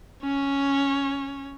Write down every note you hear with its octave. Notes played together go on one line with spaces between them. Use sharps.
C#4 C#5